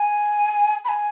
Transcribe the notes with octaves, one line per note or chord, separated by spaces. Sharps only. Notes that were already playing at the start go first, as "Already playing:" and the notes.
Already playing: G#5
B5
G#5